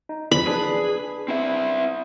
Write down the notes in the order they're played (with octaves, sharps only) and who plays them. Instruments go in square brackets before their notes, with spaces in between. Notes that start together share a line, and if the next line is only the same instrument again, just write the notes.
[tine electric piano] D#4
[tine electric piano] E2 E3 F3 [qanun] B5
[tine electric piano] D4 B4 [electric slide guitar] G#4
[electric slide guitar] C4 E4 E5